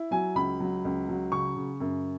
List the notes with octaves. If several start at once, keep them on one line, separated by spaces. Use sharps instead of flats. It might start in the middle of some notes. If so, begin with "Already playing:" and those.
Already playing: E4
F#3 G#5
C#2 B5
F#3
C#2
F#3
C#3 C#6
C#3
F#2